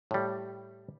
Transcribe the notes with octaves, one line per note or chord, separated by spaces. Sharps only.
A2 G3